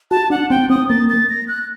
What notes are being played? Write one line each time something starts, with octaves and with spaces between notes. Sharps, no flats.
F#4 A5
D4 F#5
C4 G5
C4 D#6
A#3 A6
A6
A#6
F#6